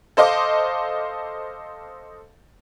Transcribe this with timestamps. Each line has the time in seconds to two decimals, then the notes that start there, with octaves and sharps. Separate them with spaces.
0.17 A4 C5 D#5 F5 D6